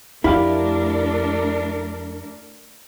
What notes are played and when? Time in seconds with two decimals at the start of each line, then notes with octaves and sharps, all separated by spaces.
0.24 F2 A3 D4 E4 G4 A#4 F5